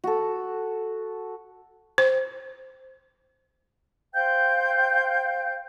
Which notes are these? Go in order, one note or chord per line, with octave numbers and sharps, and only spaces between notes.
F#4 A4
C5
C5 F5 G5 G6